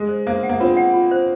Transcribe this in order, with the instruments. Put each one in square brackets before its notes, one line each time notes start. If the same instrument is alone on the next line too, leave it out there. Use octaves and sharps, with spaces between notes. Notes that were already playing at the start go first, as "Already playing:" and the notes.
Already playing: [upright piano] G#3
[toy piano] C5
[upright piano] A#3 [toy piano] C5
[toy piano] F#5
[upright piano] A#3
[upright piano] C4 [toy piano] F4
[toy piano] F#5
F4
C5